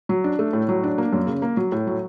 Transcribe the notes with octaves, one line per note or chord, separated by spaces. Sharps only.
F#3
D4
A3
A2
F#3
D4
A#3
F#2
C#3
A#3
F#3
A2
F#3